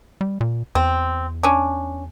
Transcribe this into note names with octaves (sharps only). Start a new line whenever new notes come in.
G3
A#2
E2 C4
C#4 D4